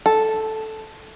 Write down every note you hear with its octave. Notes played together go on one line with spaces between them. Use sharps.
A4